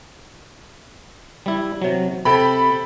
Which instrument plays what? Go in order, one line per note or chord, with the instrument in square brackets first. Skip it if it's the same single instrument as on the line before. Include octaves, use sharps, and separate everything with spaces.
[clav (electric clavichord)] G3 E4
C3 F#3
[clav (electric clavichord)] C3 [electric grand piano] A4 G5 B5